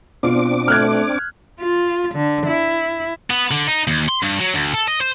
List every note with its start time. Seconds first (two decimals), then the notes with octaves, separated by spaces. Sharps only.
0.23 B2 C4 D4 F4 D6
0.68 A3 F6 F#6 G#6
1.60 F4
2.15 D3
2.47 E4
3.30 B3
3.51 D3
3.67 D#4
3.88 D#2
4.08 C6
4.22 G2
4.40 F#3
4.54 D2
4.74 A4
4.88 D#5
5.01 C5